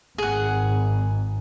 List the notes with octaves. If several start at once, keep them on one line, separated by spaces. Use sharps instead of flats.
G#1 G#4 F#5